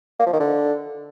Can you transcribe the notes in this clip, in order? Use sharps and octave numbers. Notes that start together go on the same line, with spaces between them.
A#3
F3
D#3
D3